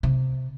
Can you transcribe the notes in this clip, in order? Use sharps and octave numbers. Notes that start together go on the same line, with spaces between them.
C3